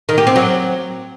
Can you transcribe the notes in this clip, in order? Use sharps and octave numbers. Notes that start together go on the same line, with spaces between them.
D#3
G4
C4
F#3